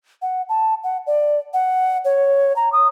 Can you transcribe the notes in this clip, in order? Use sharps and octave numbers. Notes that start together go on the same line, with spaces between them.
F#5
A5
F#5
D5
F#5
C#5
A#5
D#6